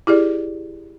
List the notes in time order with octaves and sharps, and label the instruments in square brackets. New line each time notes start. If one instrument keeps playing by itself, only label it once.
[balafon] E4 G4 G#4 D5